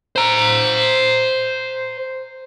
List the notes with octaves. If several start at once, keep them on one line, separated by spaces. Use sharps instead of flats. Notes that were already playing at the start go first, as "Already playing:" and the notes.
C5 A#5